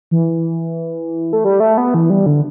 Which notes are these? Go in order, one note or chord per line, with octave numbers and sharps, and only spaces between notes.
E3
A3
G3
A3
B3
E3
G3
D3